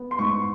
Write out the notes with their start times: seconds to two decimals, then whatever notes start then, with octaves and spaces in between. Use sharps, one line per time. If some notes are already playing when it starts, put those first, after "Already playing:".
Already playing: B3
0.11 C6
0.19 G#2 C#6